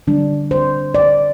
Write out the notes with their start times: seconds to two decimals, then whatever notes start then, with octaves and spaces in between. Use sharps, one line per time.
0.07 D3 G3 D4
0.51 C5
0.95 D5